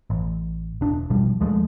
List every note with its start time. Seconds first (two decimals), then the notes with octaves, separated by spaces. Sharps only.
0.10 A1
0.81 E1 D4
1.10 A1 B2 F3 G3
1.40 D#2 F3 G#3 A3